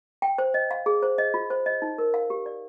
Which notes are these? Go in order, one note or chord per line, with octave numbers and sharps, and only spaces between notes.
G5
C5
D#5
F5
G#4
C5
D#5
F4
C5
D#5
D#4
A#4
F5
G4
D5